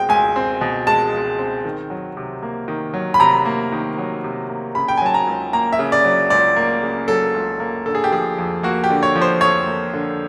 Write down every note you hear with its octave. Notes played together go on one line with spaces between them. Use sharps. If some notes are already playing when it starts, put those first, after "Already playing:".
Already playing: B2 G#3 C4 G5
C#2 G#5
C4
B2
G#3 A5
C#2
C4
D#3
F#3
C3
A#3
D#3
F#3
B5
C3 A#5
A#3
D#3
F#3
C3
A#3
C#3 B5
G5
G#5
F#3 A5
A#5
C#2
A#3 A#5
E5
C#3
D5
F#3
C#2 D5
A#3
C#3
F#3 A4
C#2
A#3
D3 A4
G#4
G4
F3 G#4
F2
A#3 F#4
G4
D3
C#5
F3
C5
F2 C#5
A#3
D3